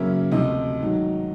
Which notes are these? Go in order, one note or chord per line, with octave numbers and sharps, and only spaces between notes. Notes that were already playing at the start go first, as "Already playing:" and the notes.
Already playing: F#2 C#3 F#3 A#3 C#4 E5
D2 C3 F3 D#5
G#2 D#3 F#3